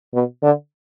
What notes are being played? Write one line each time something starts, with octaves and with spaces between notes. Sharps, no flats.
B2
D3